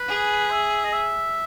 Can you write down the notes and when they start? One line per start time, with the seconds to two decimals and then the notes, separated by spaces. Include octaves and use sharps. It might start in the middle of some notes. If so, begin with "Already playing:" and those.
Already playing: B4
0.09 G#4
0.51 E5
0.84 D#5
0.93 E5